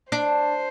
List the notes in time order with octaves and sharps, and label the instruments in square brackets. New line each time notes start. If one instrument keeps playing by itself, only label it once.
[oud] D4 [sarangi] C5